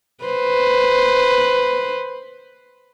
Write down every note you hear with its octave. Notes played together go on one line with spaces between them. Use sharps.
B4 C5